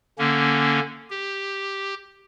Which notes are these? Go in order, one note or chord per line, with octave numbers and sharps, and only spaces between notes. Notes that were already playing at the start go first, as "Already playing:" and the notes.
D3 A#3 C#4
G4